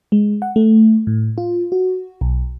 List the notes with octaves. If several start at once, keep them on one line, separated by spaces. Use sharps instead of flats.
G#3
F#5
A3
A2
F4
F#4
B1